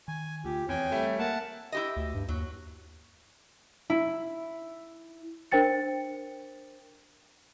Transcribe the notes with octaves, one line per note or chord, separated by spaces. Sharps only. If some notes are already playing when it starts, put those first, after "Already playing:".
D#3 G#5
D2 F4 G4
E2 C4 C#5 G5 G#5
G3 A3
A#3 A#4 E5 F#5 A5
E4 G4 D#5
D2
G2
D#2 F#3
E4
D4 A#4 C5 G5 A6 C#7